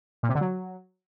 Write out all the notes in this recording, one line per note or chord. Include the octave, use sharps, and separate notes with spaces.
A#2
C3
D3
F#3